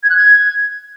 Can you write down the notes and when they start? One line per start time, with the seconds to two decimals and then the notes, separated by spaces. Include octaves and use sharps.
0.03 G#6
0.10 F#6
0.16 G#6